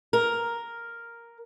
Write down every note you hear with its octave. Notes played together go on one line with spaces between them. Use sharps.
A#4